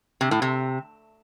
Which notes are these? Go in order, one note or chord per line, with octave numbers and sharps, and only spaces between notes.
C3
A2
C3